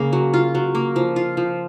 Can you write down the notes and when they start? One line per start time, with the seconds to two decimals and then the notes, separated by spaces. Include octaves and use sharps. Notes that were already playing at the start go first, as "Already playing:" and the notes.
Already playing: C#3 A#3
0.13 F#3
0.34 F4
0.55 F#3
0.75 A#3
0.96 F3
1.16 F4
1.37 F3